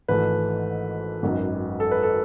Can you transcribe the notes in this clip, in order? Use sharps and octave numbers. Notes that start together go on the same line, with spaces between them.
G#1 G#2 E3 A3 B4
G#1 F#2 D#3
A4
B4
A4